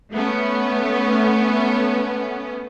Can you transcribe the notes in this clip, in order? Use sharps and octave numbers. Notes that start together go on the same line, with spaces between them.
A3 B3 C#4